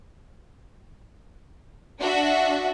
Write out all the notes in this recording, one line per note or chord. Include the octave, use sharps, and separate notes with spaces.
D4 F#4 E5